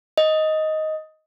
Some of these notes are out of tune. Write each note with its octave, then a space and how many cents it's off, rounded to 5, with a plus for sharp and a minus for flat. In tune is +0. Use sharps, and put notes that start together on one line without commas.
D#5 +10